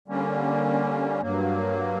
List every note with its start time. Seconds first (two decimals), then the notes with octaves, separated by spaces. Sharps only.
0.08 D3 G3 A#3 C#4
1.21 G2 F#3 A#3